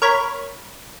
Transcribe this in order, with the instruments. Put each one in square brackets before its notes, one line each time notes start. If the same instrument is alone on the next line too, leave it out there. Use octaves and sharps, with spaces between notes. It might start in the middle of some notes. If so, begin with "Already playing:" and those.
[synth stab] A#4 C#5 B5